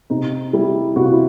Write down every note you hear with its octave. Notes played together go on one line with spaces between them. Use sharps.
C3 D#4
G3 E4
C3 F#4
F4
E4